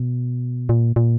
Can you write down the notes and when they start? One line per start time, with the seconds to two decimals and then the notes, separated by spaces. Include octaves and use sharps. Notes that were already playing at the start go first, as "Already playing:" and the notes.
Already playing: B2
0.69 A#2
0.96 A#2